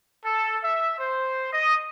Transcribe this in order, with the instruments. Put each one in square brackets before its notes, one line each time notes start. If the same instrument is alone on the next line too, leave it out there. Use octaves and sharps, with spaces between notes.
[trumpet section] A4
E5
C5
D#5